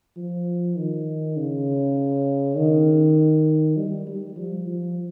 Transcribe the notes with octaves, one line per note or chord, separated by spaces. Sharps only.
F3
D#3
C#3
D#3
G3
G3
F3
F3